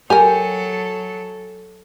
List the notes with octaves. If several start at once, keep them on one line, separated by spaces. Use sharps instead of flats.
F#3 G4 A4 A#4 G#5